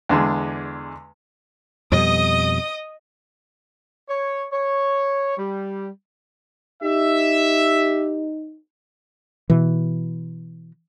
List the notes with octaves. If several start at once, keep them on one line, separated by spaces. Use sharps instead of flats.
E2 D3 G#3
F2 B2 G3 D#5 D#6
C#5
C#5
G3
D#4 G4 E5
B2 E3